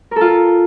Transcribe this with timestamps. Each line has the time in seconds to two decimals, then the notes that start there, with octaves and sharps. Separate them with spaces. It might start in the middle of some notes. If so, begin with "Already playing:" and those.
0.11 A#4
0.16 A4
0.21 F4